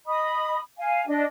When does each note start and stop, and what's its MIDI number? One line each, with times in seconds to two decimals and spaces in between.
0.06 0.58 75
0.06 0.58 83
0.06 0.58 87
0.78 1.06 77
0.78 1.06 80
1.08 1.23 62
1.08 1.23 75